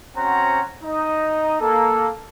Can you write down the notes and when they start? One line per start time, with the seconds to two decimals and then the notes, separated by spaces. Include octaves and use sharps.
0.16 C4 C#4 F#4 C5 F#5 A#5
0.83 D#4 D#5
1.60 A#3 A4